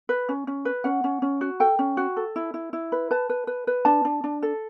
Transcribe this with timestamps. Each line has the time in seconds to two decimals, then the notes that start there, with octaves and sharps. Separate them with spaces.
0.09 B4
0.29 C#4
0.47 C#4
0.65 B4
0.84 C#4 F#5
1.04 C#4
1.22 C#4
1.41 F#4
1.60 A4 G5
1.79 C#4
1.97 F#4
2.17 A4
2.36 E4
2.54 E4
2.73 E4
2.92 B4
3.11 B4 A5
3.29 B4
3.47 B4
3.67 B4
3.85 D4 A5
4.05 D4
4.24 D4
4.43 A4